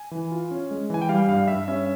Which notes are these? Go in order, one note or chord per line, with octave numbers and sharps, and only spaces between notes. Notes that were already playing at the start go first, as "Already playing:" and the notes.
Already playing: G#5
E3
F4
C#4
G#3
E3 G#5
G5
G3 F5
G2 F5
G2 E5
C#4 E5